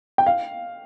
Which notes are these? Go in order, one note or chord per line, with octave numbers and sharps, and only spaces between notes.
G5
F5